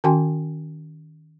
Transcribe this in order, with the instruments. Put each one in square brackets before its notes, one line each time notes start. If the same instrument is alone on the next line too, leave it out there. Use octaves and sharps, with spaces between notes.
[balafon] D#3 C#4 F#4 G5 G#5 C6